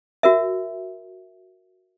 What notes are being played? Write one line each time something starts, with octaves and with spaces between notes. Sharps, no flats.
F#4 A#4 E5